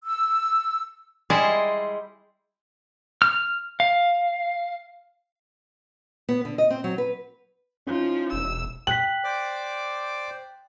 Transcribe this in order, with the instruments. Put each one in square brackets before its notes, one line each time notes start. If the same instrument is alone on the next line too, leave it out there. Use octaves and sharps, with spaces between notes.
[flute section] E6
[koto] G3 G#3 E4 G#4 C5 D#5
[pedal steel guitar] F6
F5
[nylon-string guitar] B3
D3
D#5
C4
F#3
B4
[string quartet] F3 [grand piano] C#4 D#4 E4
[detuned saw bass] E1 [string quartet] E6
[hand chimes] G5 F#6 B6 [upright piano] F#7
[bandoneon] C5 D5 D6